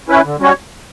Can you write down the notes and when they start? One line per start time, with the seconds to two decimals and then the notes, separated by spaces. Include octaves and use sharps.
0.09 C#4 E4 B4
0.24 D3
0.39 G3 C#4 F#4 C#5